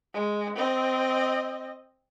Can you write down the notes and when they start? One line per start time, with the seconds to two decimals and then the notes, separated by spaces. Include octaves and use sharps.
0.14 G#3
0.56 C4 D#5